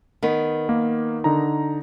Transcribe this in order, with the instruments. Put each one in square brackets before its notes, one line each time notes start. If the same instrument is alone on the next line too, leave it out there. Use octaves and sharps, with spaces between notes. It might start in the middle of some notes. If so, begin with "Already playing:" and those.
[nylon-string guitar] D#3 B3
[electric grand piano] A#3
D3 D#4 A#5